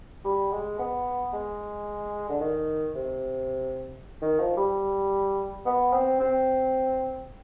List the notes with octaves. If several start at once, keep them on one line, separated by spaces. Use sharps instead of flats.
G3
G#3
B3
G#3
D3
D#3
C3
D#3
F3
G3
B3
C4
C4